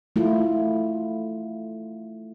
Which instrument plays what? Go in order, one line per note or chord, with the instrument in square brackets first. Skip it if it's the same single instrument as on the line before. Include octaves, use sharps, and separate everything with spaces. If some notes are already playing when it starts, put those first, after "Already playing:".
[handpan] A3 E4 F4